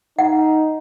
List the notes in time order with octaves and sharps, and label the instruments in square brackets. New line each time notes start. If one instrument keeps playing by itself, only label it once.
[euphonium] D#4 [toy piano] F#5